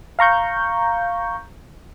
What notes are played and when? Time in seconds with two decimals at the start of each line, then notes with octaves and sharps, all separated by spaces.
0.19 F5 A#5 C#6 G6